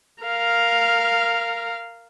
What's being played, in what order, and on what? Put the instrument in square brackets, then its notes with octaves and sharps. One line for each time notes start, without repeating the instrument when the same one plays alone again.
[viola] A#4 F5